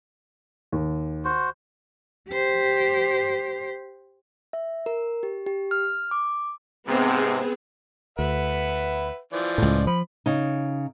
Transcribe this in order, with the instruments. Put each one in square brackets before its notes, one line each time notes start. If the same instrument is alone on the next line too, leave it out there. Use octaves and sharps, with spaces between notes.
[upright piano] D#2
[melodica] F#4 C5
[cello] G4 C5
[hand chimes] E5
A#4
G4
G4
F6
D6
[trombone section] G#2 C3 [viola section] B3 C4 G#4
[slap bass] D2 [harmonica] B4 E5 F#5
[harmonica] E3 F3 D5
[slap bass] C#2 A2
[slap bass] F3 [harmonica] B5
[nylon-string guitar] C#3 D#4